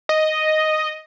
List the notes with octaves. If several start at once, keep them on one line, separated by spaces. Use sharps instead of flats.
D#5